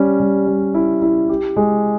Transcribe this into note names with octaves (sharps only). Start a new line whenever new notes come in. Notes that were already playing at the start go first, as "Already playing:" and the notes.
Already playing: G3 C#4
G3
G3
E4
E4
G4
G#3